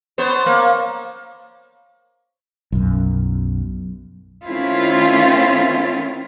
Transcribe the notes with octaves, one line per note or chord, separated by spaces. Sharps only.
B3 C5 C#5
A#3
B1 F#2
D#3 A3 C4 C#4 E4 F4